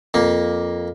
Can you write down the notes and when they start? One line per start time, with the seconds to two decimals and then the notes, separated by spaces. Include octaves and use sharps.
0.14 F2 A#3